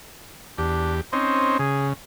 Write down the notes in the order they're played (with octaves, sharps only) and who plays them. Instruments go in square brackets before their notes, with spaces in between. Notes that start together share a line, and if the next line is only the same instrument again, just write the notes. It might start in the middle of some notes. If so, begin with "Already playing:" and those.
[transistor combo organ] E2 G4 [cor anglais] D4
[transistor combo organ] C4 C#4 D#4 [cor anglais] C5
[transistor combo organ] C#3 [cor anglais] G#4